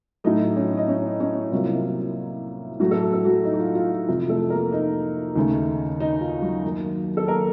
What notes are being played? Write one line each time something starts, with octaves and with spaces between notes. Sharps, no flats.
A2 F#3 A3 D#4 D#5
C#4 C#5
D#5
C#4 C#5
C#4 C#5
C2 C3 F#3 A#3 F4
A2 F#3 A3 F#4
A4
F#4
A4
F#3 F#4
D#4
F#4
F4
F4
F4
F2 C3 F3
A3 A4
A#3 A#4
D#4
D#2 C#3 A3
D#4
F4
F#3 F#4
F#2 D#3 A#3
A4
A#3 A#4